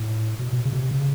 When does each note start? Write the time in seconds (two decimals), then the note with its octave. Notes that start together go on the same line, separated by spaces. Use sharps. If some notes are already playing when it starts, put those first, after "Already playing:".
Already playing: A2
0.39 B2
0.53 B2
0.65 C#3
0.73 B2
0.78 C3
0.91 C#3